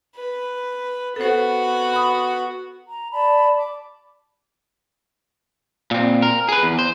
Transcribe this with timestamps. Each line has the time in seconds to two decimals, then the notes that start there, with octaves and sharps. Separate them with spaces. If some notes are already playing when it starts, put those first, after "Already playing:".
0.15 B4
1.16 B3 F#4 A4 C5
1.93 B5 D#6
2.88 A#5
3.12 D5 A5 B5
3.57 D6
5.91 A#2 C4
6.22 A#4
6.49 G#4 B4
6.63 E2
6.79 C5